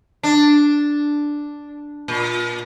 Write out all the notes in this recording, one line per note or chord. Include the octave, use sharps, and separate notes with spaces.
D4
A#2